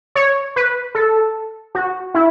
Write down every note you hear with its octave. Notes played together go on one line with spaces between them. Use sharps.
C#5
B4
A4
F#4
E4